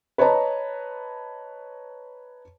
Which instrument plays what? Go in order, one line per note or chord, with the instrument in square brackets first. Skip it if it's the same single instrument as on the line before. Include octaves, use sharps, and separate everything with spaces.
[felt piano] B4 C#5 D#5 A5 A#5